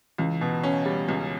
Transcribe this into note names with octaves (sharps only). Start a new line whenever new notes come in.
C#2 E3
B2
C#4
G3
C#2